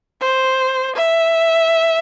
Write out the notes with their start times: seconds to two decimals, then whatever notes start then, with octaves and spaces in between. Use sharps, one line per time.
0.21 C5
0.96 E5